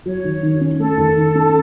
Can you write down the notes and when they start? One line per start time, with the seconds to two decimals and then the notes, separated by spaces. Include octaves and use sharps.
0.06 F#3 C#5
0.24 D#3
0.43 D#3
0.61 C#4
0.79 A3 A4
0.98 D#3
1.16 D#3
1.35 C#4